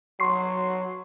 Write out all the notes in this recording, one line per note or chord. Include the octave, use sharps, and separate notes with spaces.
F#3 C6 C#6 C7